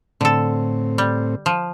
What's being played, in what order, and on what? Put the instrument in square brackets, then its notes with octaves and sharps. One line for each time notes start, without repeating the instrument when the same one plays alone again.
[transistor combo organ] A2 C4 [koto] D3 A4
[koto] G3
F3